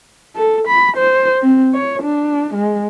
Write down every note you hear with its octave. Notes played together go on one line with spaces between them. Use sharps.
A4
B5
C5
C4
C#5
D4
G#3